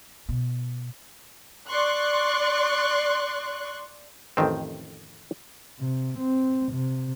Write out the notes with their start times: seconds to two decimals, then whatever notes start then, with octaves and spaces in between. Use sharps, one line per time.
0.29 B2
1.69 D5 C6 C#6 F#6
4.37 A1 F2 D#3 C4
5.80 C3
6.19 C4
6.73 C3